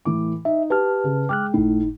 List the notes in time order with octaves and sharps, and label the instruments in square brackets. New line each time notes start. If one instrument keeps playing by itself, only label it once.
[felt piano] A2 E3 D6
[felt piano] D#4 [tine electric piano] E5
[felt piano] G4 [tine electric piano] B4 A5 F6
[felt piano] C#3
[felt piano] G#3 G5 [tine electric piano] D6 F6 F#6
[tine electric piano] G1 D#4 [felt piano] A2